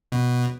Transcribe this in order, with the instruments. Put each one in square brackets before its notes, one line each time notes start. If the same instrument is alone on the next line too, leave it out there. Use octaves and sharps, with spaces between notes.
[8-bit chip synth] B2